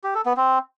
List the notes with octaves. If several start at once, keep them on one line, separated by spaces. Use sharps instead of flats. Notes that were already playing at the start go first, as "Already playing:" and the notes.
G4
A4
B3
C4